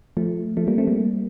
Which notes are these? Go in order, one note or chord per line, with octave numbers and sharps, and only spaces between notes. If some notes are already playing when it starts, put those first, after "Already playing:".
F3 A3
F3 A3
G3 A#3
A3 C4
G3 A#3